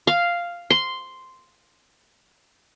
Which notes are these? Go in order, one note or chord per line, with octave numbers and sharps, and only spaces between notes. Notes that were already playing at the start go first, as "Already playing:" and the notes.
F5
C6